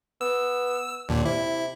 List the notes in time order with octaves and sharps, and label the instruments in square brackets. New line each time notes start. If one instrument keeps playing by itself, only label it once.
[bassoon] B3 [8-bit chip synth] E6
[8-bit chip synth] D#2 A#2 [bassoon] D4
[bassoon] C3 [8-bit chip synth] E4